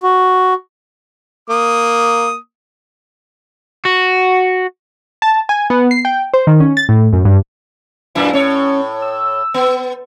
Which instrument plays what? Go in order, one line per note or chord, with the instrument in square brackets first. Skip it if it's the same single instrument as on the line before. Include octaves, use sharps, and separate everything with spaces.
[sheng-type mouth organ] F#4
[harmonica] A#3 D#6
[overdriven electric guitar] F#4
[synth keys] A5
G#5
B3
C7
G5
C5
D#3
C#4
A6
A2
F#2
G2
[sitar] F#2 A#2 E4
[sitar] A2 C#5 [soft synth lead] C#4
[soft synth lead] E6
[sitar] B3